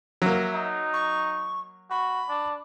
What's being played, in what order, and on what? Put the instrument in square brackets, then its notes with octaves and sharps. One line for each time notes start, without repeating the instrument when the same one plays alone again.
[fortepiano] F#3 A#3 [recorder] E5
[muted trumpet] D#4
[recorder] C#6
[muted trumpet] F#4 [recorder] B5
[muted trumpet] D4